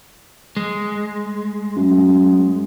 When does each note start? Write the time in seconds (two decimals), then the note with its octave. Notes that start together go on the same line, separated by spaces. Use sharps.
0.57 G#3
1.76 F#2